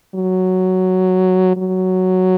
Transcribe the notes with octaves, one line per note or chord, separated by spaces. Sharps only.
F#3
F#3